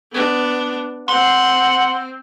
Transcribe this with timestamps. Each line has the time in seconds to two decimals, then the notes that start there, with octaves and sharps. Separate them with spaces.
0.12 B3 D4
1.09 C4 F#5 C6